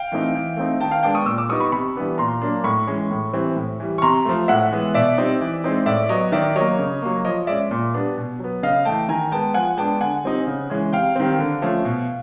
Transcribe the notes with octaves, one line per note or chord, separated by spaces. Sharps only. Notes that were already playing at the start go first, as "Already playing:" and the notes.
Already playing: F5 G5
E3 A3 C4 D#4
E3
A3 C4 D#4
D#3 G5 A5
F5 G5
G#3 B3 D4 G5 A5
C#6 D#6
A#2 D6 E6
D6 E6
G3 B3 D#4 C#6 D#6
B5 C#6
C3 B5 C#6
E3 G3 B3 D4
A#2 A#5 C6
F#3 A#3 D4
A2 B5 C#6
E3 G#3 C#4
A2
E3 G3 C4
A2
E3 G3
C#6
C3 A#5 C6
F3 A3
A2 E5 F#5
E3 G#3 B3
B2 D5 E5
G3 C4 D#4
E3
G#3 C4 D#4
A2 D5 E5
F#3 B3 C#5 D#5
D#3 D5 E5
F#3 A#3 C#5 D#5
C#3
F#3 A#3
F3 C#5 D#5
G#3 C#4 D5 E5
A#2
G3 B3 D4
B2
F#3 B3
C#3 D#5 F5
E3 A3 G5 A5
D#3 G#5 A#5
G#3 B3 G5 A5
F3 F#5 G#5
G#3 B3 D4 G5 A5
D3 F#5 G#5
G3 C4 D#4
C#3
E3 G#3 C#4
C3 F5 G5
D#3 G3 C4
D3
F3 A3 C#4
B2